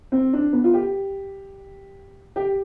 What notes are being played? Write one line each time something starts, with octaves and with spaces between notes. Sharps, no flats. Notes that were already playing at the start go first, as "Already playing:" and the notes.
C4
D4
B3
F4
G4
G4